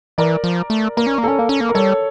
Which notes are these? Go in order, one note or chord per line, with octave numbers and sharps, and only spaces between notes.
E3 A#4 D5
F3
A3
A#3 A#4
C#4
A#3
C#4 A4
A#3
C#4
A#3
A#4
G3 A4 C#5